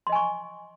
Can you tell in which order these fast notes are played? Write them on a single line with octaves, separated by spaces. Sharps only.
C6 D#5 G#5 C#6